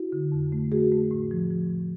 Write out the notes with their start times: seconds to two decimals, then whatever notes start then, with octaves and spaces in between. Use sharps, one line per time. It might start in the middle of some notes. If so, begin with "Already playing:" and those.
Already playing: E4 F#4
0.12 D3
0.32 F2
0.52 A3
0.72 A3 F#4 G#4
0.92 A3
1.11 A2
1.31 F3
1.51 F3
1.70 A2